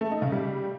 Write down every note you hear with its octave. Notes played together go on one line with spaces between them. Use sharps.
A3
D#4
C#3
G3